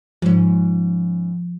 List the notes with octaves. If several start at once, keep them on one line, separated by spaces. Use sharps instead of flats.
G#2 F3 C#4